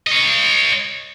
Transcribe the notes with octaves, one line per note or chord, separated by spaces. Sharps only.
C#5 D#5